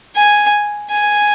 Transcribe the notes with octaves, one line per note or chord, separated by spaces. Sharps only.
G#5
G#5